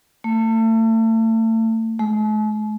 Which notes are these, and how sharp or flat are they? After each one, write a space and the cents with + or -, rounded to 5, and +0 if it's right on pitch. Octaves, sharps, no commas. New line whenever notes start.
A3 +35
A3 -45